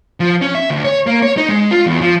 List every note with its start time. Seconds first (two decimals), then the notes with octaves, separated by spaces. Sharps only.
0.20 F3
0.41 C#4
0.55 E5
0.70 D2
0.85 C#5
1.07 A#3
1.22 C#5
1.37 D#4
1.49 G#3
1.71 F4
1.85 E2
2.01 F3